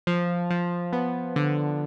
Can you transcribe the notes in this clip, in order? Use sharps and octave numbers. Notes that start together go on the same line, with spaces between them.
F3
F3
B3
D3